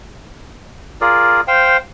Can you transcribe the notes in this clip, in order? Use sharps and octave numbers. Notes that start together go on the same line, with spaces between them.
F4 G#4 A#4 D5
C5 F5 G5